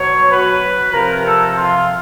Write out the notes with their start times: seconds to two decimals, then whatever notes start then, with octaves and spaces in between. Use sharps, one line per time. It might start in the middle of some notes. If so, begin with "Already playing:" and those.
Already playing: B2 F#3 C#5
0.30 B4
0.92 C3 F3 A#4
1.24 A4
1.56 F4